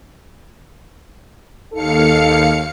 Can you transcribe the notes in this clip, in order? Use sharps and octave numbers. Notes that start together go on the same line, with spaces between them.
D#2 D#4 A4 F5 C#7